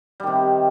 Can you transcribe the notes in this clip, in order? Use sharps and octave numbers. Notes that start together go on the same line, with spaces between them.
C3 D#3 G3